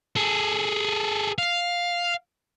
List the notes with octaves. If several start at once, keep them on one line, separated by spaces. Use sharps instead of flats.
G#4 A4
F5